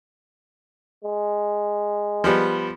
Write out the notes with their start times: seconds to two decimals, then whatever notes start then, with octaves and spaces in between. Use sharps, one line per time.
1.04 G#3
2.24 F3 G3 B3